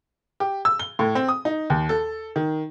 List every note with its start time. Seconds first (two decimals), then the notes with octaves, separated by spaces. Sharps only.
0.40 G4
0.65 E6
0.79 G7
0.99 A2
1.15 C4
1.28 D#6
1.45 D#4
1.70 D#2
1.89 A4
2.36 D#3